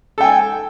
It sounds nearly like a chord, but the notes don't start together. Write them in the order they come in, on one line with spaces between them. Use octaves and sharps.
A4 G5 G#5